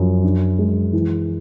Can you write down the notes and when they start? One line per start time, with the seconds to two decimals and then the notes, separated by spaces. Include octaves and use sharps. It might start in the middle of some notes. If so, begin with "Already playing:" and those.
Already playing: F#2 F3
0.24 D4
0.59 G#3
0.93 E3